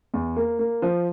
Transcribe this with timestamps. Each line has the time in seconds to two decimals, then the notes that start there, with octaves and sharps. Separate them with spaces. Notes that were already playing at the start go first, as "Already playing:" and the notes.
0.14 E2
0.36 A#3
0.59 A#3
0.82 F3